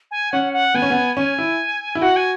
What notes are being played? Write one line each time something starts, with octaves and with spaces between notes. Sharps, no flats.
G#5
C#4 F#5
F#5
B3 G#5
C#4
B3
C#4 G#5
E4
E4
F#4 F#5
G#5